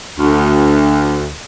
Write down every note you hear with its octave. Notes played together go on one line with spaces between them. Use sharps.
D2